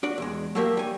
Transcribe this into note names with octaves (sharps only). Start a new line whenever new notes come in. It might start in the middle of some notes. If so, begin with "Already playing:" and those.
D4 F#4 D5
E2 G#3
F#3 A3 A#3 G4 A#4 E5
G3 G#5